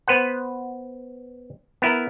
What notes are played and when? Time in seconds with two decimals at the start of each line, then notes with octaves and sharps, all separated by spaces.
0.08 B3 B4 C5 F#5
1.82 B3 E4 A#4